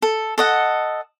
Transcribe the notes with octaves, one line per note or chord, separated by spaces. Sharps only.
A4
A4 D#5 F#5